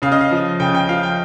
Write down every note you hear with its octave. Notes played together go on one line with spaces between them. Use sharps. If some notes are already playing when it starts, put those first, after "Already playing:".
C#3 F5
D#5
F5
F3
C#3 G5
G5
F3 F5
G5